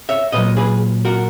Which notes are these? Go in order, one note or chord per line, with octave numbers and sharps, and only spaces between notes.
C#5 E5
A#2 F#3 B4 D#5
G#4 B4
F#4 A#4